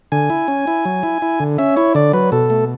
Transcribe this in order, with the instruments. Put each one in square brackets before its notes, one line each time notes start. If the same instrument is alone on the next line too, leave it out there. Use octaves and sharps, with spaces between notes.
[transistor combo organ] D3 G#5
E4
C#4
E4
F#3
E4
E4
D3
C#4 E5
E4 C#5
D3 D5
F#3 B4
B2 A4
A3